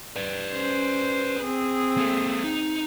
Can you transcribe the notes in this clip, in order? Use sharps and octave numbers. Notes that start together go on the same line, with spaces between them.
B4 D5
C#4 C5
C4 G#4
A#3 A4
D#4